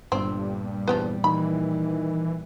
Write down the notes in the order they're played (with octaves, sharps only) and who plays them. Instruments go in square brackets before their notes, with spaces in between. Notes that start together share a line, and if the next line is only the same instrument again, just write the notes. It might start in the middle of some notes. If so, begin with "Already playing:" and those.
[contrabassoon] G1 [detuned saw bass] G2 [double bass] A#2 G3 [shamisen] C4
[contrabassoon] E2 [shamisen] F3 G4 B4
[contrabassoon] D#3 [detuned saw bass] E3 [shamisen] B5